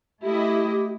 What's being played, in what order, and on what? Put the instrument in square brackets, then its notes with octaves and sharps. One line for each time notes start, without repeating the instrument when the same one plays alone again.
[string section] A3 E4 D#5 [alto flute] G4